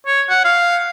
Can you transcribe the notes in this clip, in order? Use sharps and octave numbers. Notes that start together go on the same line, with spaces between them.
C#5
F#5
F5